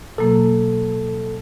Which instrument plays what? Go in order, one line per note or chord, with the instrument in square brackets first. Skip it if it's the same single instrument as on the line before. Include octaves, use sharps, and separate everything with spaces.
[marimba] B2 F#3 A#3 [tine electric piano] A4